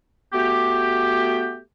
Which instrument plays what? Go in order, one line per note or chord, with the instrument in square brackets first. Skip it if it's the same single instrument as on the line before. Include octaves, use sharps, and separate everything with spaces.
[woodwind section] A3 B3 F#4 G4